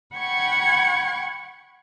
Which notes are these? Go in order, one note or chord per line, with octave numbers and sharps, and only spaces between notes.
F#5 G5 B5 C#6 G#6